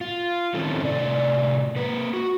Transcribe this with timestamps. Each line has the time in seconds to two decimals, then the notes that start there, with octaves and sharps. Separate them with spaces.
0.01 F4
0.55 D#3 C4 C#4 E4 A4
0.83 A2 C3 D5
1.76 A#3 B4
2.13 F#4